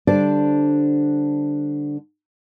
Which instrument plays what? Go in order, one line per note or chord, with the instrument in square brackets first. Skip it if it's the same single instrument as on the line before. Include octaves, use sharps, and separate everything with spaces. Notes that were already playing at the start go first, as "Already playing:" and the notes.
[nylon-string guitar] D3 G3 D4 C5 D5